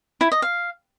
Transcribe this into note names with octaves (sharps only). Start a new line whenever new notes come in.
E4
D#5
F5